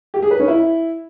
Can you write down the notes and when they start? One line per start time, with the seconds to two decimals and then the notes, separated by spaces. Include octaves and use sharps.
0.14 G4
0.22 G#4
0.31 B4
0.39 C#4
0.48 E4